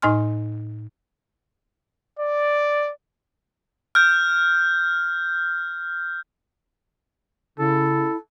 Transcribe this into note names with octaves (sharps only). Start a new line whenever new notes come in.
A2 D#4 D#5 G#5 C6 F6
D5
F6 G6
C#3 E4 A4